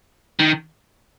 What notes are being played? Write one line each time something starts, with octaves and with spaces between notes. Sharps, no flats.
D#3